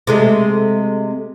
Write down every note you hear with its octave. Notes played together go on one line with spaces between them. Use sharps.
C3 G#3 A3